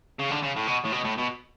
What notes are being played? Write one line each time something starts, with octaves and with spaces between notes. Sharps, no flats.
C#3
D3
C#3
A2
B2
A2
B2
A2
B2